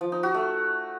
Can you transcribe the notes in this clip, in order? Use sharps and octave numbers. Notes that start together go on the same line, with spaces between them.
F3
D#4
F#4
A3